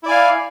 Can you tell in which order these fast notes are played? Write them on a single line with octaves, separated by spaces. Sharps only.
E4 D5 G#5 F5